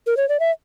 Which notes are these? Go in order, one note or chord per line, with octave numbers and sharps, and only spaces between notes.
A#4
C#5
D5
E5